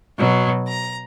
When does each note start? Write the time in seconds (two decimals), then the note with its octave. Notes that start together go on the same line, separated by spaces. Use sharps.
0.18 B2 F#3
0.67 A#5